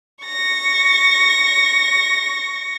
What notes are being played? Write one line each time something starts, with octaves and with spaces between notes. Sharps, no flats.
C#6 A#6